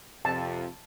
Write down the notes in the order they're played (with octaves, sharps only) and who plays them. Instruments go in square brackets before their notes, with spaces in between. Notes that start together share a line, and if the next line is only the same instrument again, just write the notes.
[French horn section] F2 C3 [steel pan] A5